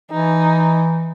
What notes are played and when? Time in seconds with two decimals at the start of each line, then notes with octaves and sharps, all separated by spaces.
0.11 E3 D#4